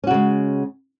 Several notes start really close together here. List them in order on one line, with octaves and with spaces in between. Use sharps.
C#4 F#4 C#3 G#3